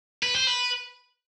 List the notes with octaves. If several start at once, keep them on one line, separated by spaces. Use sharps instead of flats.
B4
C5
B4